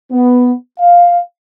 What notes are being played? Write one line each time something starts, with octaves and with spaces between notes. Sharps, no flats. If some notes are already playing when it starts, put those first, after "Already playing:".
B3
F5